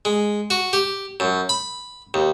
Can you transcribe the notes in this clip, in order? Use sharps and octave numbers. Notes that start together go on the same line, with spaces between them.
G#3
F#4
G4
F#2
B5
D#2